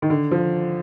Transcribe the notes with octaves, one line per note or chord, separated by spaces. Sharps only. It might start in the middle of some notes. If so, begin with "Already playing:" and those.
D#3
D3
F3